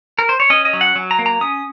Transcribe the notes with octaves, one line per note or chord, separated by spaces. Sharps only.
A#4
C5
C#5
C#4 D#5
D#5
F#3
F#5
F#3
A#5
A#3
A#5
C#4 D#6